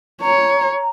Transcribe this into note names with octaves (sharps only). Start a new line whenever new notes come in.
C#5 A#5